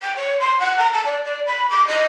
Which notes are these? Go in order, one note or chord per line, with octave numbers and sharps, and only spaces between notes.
G5
C#5
C6
F#5
A#5
A5
D5
D5
B5
D6
D#5